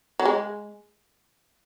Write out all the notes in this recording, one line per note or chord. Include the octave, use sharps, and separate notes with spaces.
F#3
G#3